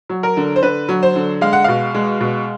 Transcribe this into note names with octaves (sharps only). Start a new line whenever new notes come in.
F#3
A#4
D3
C5
D3 B4
F#3
C5
D3
G#3 F5
F#5
B2 F5
G#3
B2